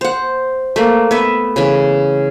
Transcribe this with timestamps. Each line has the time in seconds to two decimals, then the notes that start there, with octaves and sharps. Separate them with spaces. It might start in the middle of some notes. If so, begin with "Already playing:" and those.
0.01 C5 F#5
0.76 A3 A#3
1.11 B3 E5
1.56 C#3 E3